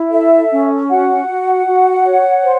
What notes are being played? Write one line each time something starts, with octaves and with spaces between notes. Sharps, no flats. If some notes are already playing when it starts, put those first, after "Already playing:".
Already playing: E4
A4 E5
C#4
F#4 F#5
F#4
F#4
C#5
C5